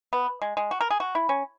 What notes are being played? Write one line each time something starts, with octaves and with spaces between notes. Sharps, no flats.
B3
G#3
G#3
F#4
A#4
G#4
F#4
E4
C#4